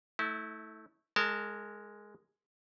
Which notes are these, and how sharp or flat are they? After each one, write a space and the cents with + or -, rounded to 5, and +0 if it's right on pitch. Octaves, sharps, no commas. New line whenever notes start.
A3 +0 E4 -30
G#3 +0 A#4 -25 A5 +0